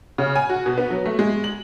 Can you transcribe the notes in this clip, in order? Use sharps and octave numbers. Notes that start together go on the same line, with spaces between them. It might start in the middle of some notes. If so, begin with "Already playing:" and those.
C#3
G#5
F#4
B2
B3
F#3
A3
G#3
F#7